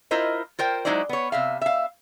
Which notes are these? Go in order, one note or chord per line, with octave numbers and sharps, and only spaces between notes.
E4 F4 A#4 C5 D#5
F4 A#4 C5 G5
F#3 G#3 D#4 E4 C5 D5
B3 C#5
C3 E5 F5
E5 F5